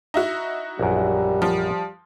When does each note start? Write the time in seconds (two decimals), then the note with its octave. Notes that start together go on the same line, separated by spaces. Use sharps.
0.14 D#4 E4 F#4
0.79 A#1 F#2 G3
1.42 F3